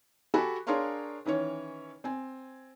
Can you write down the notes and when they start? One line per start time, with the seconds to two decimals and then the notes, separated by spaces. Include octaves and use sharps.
0.34 F#4 G4 A4 G#5 B5
0.67 D4 G#4 A#4 C#5 F5 C6
1.25 D#3 E3 C#4 C#5
2.04 C4 G#5